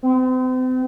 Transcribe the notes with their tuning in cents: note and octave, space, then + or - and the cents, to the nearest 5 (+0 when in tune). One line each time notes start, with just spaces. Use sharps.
C4 -40